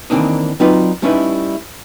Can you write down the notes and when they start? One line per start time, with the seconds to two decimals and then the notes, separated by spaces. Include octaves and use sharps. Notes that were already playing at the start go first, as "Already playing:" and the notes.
0.10 D#3 E3 A#3 C4 D4 D#4
0.60 F#3 C4 D#4 F4 B4 D5
1.02 G3 A3 C#4 D#4 E4 B4